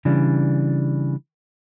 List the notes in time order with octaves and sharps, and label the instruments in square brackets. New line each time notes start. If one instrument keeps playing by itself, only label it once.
[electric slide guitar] C#3 E3 G3 D4